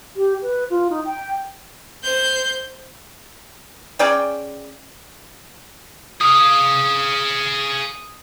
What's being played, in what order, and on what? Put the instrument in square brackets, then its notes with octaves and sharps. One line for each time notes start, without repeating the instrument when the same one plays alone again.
[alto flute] G4
B4
F4
D#4
G5
[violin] C5 G6
[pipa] C#4 G#4 D5 G5
[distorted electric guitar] G#4 F5 [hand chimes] D#6